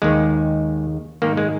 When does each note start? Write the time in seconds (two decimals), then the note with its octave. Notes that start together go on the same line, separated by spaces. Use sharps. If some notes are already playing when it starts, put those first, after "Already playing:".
0.02 D#2 D#3 G#3
1.22 G#2 D#3 A#3
1.37 G#3